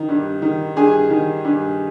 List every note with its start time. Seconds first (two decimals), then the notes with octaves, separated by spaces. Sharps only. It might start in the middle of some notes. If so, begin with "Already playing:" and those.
Already playing: D#3
0.09 G2
0.42 D#3
0.77 G2 G#4 G#5
1.10 D#3
1.44 G2